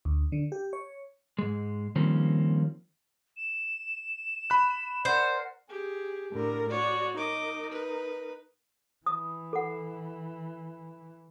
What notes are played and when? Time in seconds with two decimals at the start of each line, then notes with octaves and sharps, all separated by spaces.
0.05 D2
0.32 D3
0.52 G4
0.73 C#5
1.39 G#2 G#3
1.96 D#3 F3 G3 A#3 C4 C#4
3.37 E7
4.50 B5 F#6
5.05 A#4 C5 D5 F#5
5.69 G4 G#4
6.32 A2 D3 A#4
6.70 F#4 C#5 D5
7.17 D#4 A#4 D#5 D6
7.71 B4
9.06 E3 D#6
9.53 A4 F#5